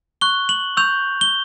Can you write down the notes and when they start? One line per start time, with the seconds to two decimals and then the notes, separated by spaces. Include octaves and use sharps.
0.21 C#6 F#6 G7
0.49 F#7
0.77 C#6 E6 G6 F7
1.21 G7